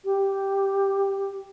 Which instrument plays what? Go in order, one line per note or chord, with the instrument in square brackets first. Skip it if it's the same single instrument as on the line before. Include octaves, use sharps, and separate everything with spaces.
[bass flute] G4